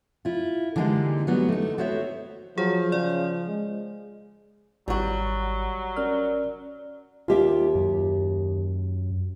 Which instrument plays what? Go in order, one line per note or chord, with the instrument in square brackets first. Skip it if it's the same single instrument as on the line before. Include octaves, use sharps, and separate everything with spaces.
[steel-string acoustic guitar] E4 F4
D3 E3 G3 G#3 A#3 D#4
F#3 G3 B3 F#4
A3 D#4
B3 F#4 C5 C#5 E5
[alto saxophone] F3 [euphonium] F#3 [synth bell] G#4
[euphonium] C#3 [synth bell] D5
[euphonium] G#3
[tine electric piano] G#1 [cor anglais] F#3 [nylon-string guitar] G3 F#4
[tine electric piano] C#4 A#4 F6 [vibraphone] D5
[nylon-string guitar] D#2 G4 E5 [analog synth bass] F4
[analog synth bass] F#2